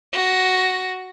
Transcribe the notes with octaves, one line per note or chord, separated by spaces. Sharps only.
F#4 A#6